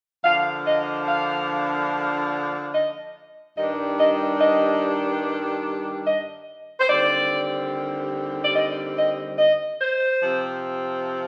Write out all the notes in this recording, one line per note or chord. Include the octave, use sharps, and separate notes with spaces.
D3 F3 A#3 D4 F5
D#5
F5
D#5
G2 D#3 G3 D4 D#5
D#5
D#5
D#5
C5
D#2 D3 G3 C4 D5
D5
D#5
D#5
D#5
C5
C3 F3 C4